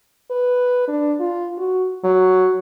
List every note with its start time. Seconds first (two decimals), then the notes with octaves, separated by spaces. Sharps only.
0.30 B4
0.88 D4
1.20 F4
1.58 F#4
2.04 F#3